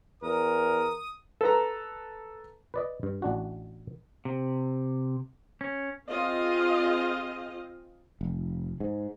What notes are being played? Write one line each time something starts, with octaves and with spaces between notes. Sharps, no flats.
E2 A#4 D#6
A4 B4 A#5
B4 D5 D#5
G2
A1 D4 F#4
C3
C#4
C4 F4 G#4 D#5 F5
F1
G#2